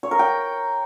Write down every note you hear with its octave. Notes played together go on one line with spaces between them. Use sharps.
C#5
A#4
G5